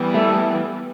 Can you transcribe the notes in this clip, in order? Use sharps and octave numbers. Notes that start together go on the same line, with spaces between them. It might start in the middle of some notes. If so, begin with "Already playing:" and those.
Already playing: E3 G3 B3
A3